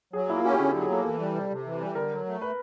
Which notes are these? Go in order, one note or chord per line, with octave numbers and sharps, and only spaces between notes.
F#3 G#4
A#3 E4
F4
C#4 F#4
G4
D3 G#4
F#3 G4
G#4
A#3 A4
E3 A4
G3
C3
C3
E3
G3
D3 A#4
F#3
A3
B4